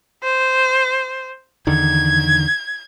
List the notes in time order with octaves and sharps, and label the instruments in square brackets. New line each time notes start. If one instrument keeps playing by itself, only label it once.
[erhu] C5
[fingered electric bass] E2 D3 D#3 [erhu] G#6